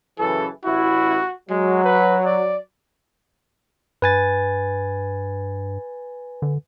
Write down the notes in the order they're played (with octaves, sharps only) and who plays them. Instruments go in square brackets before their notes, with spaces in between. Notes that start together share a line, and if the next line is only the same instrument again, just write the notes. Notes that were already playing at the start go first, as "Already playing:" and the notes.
[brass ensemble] F#2 C#3 E3 [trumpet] A4
[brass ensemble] A1 E4 [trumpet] F#4
[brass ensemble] F#3 [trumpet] G#3
[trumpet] B4
D5
[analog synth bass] G2 [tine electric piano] B4 G#5 A6
[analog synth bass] D3